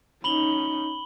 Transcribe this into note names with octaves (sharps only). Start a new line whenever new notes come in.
C#4 D#4 B5 F#7 G7